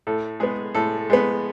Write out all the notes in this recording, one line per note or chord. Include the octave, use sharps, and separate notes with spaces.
A2 A4
G#3 B3 G#4
A2 A4
G#3 B3